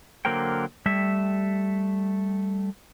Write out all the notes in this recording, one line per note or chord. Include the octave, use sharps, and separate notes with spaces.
D3 F#3 A#3 A#4 C5 G5
G3 A3 E5